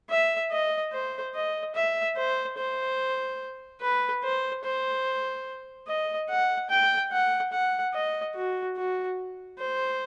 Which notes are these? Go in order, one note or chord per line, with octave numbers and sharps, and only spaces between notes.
E5
D#5
C5
D#5
E5
C5
C5
B4
C5
C5
D#5
F#5
G5
F#5
F#5
D#5
F#4
F#4
C5